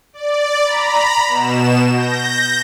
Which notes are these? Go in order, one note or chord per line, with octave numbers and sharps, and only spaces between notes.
D5
A#5 B5
B2 E7
G6 A#6